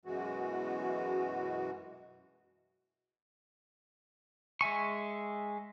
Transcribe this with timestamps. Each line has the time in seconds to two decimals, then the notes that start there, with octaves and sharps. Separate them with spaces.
0.05 F#2 B2 E3 G#3 F#4
4.61 G#3 E5 G#5 C#6